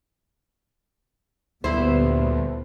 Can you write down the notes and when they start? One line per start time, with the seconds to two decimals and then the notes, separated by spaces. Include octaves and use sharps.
1.64 D2 A#2 G3 B3 E4 C5